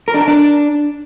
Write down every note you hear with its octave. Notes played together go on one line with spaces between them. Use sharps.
A#4
D4
A#4
D4